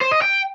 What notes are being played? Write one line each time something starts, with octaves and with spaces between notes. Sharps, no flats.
C5
D#5
G5